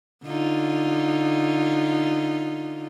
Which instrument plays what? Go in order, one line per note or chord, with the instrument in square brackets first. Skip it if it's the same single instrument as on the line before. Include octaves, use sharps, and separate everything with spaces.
[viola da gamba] D3 D#4 F4